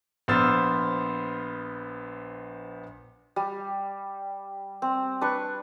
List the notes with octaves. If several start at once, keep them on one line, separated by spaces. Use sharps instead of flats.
A#1 B3 C5 E6 F6 A6
G3
C4
D4 B4 C#6